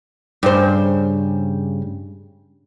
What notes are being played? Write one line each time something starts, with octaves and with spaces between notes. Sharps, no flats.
G2 C#3 C5